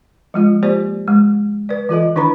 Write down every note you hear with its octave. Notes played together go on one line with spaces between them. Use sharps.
F3 G#3 F4
A#3 F4 G4 C5 D5
G#3
B4 D5
E3 F4 A4 D#5
D#3 D4 E4 B4 A#5 B5